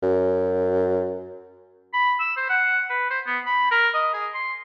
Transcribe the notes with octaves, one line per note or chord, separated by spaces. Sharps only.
F#2
B5
E6
C5
F#5
B4
C5
B3
B5
A#4
D#5
G#4
C6